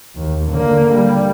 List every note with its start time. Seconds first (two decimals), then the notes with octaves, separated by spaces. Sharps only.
0.15 D#2
0.51 D3 A#3
0.93 G3